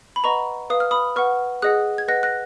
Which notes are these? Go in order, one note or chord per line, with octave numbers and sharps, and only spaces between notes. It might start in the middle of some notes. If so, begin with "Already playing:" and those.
B5
B4 D#5 F#5 A#5 C#6
B4 F5 D#6
F6
B5 D#6
B4 F#5 C#6 F6
G#4 D#5 F#5 D#6 F#6
G#6
B4 D#5 F#5 F#6 A#6
F#6 A#6